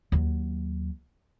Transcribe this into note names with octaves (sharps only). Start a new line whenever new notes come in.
D#2 F#3